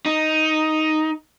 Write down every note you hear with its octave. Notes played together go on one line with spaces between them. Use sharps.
D#4